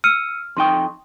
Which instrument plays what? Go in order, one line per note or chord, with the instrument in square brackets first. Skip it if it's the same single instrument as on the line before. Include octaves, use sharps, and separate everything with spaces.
[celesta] E6 C#7 D#7 [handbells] F6
[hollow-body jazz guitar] F2 D#4 G5 [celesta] C6 C#6 D#6